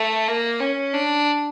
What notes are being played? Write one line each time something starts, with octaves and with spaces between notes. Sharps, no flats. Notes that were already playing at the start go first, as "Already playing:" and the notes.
Already playing: A3
A#3
C#4
D4